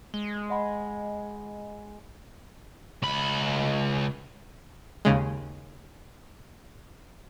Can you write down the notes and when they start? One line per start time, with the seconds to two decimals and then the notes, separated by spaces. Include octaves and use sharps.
0.14 G#3 G7
0.50 D#5 F#5 B5
3.02 C#2 B5
5.05 D#2 C#3 G#3